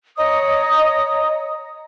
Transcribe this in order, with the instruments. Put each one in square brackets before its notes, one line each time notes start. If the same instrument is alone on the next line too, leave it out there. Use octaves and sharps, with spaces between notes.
[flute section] C#5 D#5 A#5 D#6